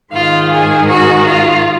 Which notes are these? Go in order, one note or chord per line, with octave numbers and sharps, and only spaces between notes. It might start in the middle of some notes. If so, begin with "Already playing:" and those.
G#2 D#3 F4
G#4
F#4
F4